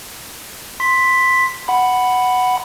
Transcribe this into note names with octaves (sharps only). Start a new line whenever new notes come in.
C6 B6
F#5 B5